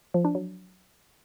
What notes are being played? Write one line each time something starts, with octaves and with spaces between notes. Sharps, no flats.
F3
D4
F#3